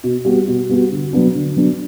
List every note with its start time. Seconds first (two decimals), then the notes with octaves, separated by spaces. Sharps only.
0.04 B2
0.25 G3 B3 F#4
0.47 B2
0.69 G3 B3 F#4
0.91 D3
1.13 F#3 B3 D4
1.35 D3
1.56 F#3 B3 D4